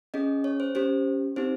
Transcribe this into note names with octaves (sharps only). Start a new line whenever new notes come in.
C#4 G#4 D#5
C#5
C5
C#4 G4 C5
C4 D#4 G4 C5